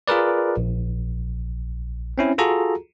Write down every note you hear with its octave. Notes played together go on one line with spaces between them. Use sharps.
F4 G#4 A#4 B4 D5
A#1
C4 C#4 E4
F4 F#4 G#4 A4 A#5